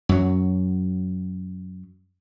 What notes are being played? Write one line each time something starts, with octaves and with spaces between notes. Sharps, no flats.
F#2 F#3